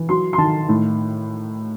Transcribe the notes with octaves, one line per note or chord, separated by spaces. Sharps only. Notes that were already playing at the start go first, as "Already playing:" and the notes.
Already playing: E3
F#3 C6
C6
D#3 A5
A2